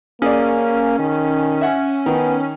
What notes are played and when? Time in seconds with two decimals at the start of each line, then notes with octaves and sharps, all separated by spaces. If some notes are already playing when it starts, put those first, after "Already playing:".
0.22 A#3 C#4 G#4 D5
0.99 D#3
1.61 E5 F#5 G#5
2.06 D#3 B3